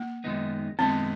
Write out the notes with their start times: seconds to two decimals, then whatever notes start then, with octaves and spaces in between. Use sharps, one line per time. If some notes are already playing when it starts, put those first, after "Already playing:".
Already playing: A#3
0.24 F#2 D#3 G#3 B3 D#4
0.79 F#2 D#3 G#3 B3 C4 D#4